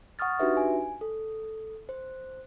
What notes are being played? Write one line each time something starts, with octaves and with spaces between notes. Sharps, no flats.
F#5 C#6 D#6 F6 A6
D4 D#4 F#4 G4 B4 E5
G#5
A4
C5